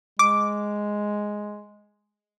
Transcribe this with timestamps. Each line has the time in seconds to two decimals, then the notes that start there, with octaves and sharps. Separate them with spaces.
0.19 G#3 D6